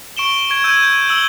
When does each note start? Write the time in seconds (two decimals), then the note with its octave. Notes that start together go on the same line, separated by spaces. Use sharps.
0.17 C#6 D7 E7 G7
0.50 C#6 G#6 D7
0.64 E6 G6 G#6 D#7 E7
0.83 G6
1.08 E6 F#7 G7